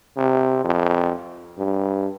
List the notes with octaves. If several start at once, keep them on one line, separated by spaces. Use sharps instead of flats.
C3
F2
G2